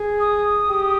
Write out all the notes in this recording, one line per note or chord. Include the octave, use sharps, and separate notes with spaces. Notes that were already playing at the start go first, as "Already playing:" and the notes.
Already playing: G#4
D#6
G4